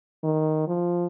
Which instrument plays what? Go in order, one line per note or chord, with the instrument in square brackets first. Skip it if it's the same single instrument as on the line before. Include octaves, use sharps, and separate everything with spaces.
[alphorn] D#3
F3